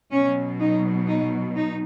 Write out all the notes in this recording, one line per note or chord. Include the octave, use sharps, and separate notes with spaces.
B2 F#3 C#4
D#4
D#4
D#4